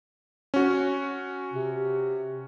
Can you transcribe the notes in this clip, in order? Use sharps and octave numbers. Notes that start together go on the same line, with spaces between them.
C#4 F#4
C3